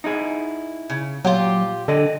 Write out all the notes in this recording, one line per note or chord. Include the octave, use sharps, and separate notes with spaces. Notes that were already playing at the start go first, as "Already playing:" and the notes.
D#4 E4 G#4
C#3
A#2 F#3 F4 G4
D3 A4 D5 D#5